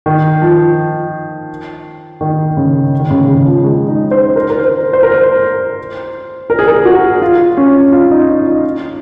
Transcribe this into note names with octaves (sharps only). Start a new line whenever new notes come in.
D#3
F3
D#3
C#3
D#3
C#3
C#3
F3
G#3
D#4
C5
A#4
A#4
C5
C5
A#4
C5
A#4
G#4
A#4
F#4
F4
C#4
F4
D#4
D#4
D#4
D#4